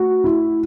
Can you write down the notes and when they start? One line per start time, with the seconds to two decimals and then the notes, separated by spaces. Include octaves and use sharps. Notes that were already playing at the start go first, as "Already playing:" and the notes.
Already playing: A3 F#4
0.24 E4